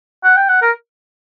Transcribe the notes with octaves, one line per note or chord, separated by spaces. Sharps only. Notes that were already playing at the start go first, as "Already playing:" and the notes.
F#5
G5
F#5
A#4